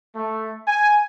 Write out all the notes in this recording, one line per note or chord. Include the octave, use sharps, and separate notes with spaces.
A3
G#5